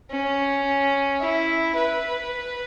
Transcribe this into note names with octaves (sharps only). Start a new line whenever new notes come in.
C#4
E4
B4